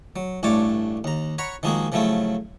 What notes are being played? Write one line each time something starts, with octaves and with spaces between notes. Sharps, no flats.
F#3
A1 G2 A3 C#5 D5 D6
D#2 A#5
C#5 F#5 A#5 B5
D#3 F3 G#3 A#3 F#4 G#4
C#3 F3 F#3 A3 E4 F4